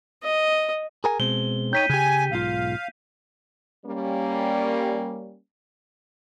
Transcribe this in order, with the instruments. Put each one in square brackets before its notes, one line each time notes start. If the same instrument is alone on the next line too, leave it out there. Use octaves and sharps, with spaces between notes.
[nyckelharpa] D#5
[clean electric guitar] G#4 A#4 G#5
[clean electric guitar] B2 G#3 C4 [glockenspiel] G7
[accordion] D#4 C#5 G5 [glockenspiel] G6 B6 D#7
[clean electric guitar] C#3 G4 [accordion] G#5
[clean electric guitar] B1 G#2 F4 [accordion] F5
[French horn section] G3 A#3 C#4